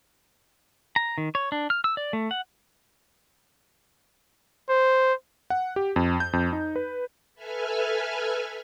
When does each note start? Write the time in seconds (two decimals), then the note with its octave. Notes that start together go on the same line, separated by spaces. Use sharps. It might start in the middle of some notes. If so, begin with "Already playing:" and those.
0.96 A#5
1.18 D#3
1.35 C#5
1.52 D4
1.70 F6
1.84 E6
1.97 D5
2.13 A3
2.31 F#5
4.69 C5
5.50 F#5
5.76 G4
5.96 F2
6.20 G6
6.33 F2
6.53 D#4
6.76 B4
7.34 A4 B4 E5 G#5 F6